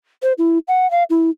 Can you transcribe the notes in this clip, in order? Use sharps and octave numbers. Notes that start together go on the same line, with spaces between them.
C5
E4
F#5
F5
E4